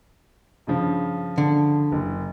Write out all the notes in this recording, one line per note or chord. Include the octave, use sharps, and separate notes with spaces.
G2 C#3 F3
D3
F#1